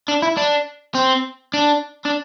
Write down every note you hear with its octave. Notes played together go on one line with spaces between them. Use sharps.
D4
E4
D4
C4
D4
D4